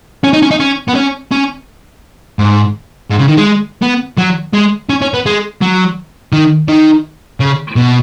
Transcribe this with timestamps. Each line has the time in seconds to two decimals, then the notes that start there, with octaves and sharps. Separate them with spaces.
0.24 C#4
0.33 D#4
0.42 C#4
0.51 D#4
0.60 C#4
0.89 B3
0.96 C#4
1.32 C#4
2.39 G#2
3.11 G#2
3.20 C#3
3.28 D#3
3.38 G#3
3.82 B3
4.18 F#3
4.54 G#3
4.89 C#4
5.02 C#4
5.14 B3
5.26 G#3
5.61 F#3
6.33 D#3
6.69 D#3
7.40 C#3
7.76 B2